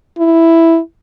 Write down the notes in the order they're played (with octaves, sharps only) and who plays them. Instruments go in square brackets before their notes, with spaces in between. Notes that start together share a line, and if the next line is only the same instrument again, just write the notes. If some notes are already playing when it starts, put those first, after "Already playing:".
[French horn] E4